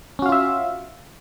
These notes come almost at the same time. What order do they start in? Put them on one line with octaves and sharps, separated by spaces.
C#4 F#4 F5 F4 E5